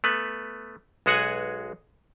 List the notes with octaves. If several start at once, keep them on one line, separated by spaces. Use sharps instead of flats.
A3 B3 B4
B1 G#3 F#4 G#4 F#5 G#5